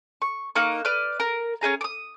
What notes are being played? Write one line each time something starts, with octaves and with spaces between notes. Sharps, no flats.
C#6
A#3 D#4 C#6 F#6
B4 D5 F6
A#4
C#4 D#4 G#4 A#5
D6 D#6